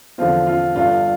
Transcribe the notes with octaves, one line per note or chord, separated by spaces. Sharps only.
E2 D3 F3 C4 F4
F4
G1 G2 D3 F4